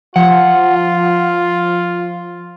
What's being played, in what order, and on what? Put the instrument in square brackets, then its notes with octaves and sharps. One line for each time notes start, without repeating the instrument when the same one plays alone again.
[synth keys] F3 [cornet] F4 [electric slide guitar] F#5